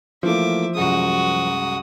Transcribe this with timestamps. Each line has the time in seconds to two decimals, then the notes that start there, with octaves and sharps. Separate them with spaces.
0.23 E3 F3 A3 A#3 E5 D6
0.75 C2 F#2 G#3 F#4 D#6